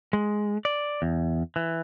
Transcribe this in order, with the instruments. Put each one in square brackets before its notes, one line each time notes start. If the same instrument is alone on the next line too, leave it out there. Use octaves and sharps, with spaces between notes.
[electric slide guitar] G#3
D5
E2
E3